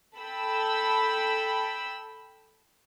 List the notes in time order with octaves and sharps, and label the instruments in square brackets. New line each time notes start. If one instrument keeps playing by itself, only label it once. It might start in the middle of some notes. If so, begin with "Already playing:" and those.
[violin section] A4 G5 B5 E6